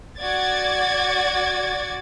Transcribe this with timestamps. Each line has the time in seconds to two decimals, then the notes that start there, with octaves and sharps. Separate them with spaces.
0.20 F#4 D5 G#6 A6